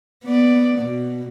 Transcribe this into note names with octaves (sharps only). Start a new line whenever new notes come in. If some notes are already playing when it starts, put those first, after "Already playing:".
B3 D5
B2